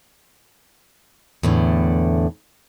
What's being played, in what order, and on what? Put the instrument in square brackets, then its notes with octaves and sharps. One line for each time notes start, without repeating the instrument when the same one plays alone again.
[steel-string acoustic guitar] E2 A2 D3